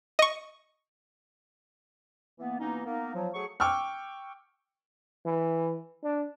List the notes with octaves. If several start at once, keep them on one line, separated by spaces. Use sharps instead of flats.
D#5 C#6
E3 A#3 B3
B2 E3 A#3 B3 C#4 D#4
A#3 B3 D#4
F3 F#3
F#3 A3 G#4 C#6
G5 C#6 D6 E6 F6
E3
D4